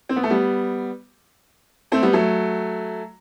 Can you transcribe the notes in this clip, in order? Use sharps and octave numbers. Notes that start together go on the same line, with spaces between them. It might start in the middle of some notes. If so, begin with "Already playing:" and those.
C4
B3
A3
G3 B3
A3 C4
G3 B3
F#3 A3